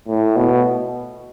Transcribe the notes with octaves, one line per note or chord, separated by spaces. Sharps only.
A2
B2